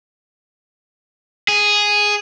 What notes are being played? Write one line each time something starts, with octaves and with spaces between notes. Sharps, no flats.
G#4